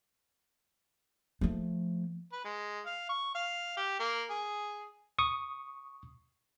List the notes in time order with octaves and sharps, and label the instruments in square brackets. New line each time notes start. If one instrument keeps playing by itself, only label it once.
[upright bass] F3 A3
[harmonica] B4
G#3
F5
C#6
F5
G4
A#3
G#4
[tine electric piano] C#6 D#6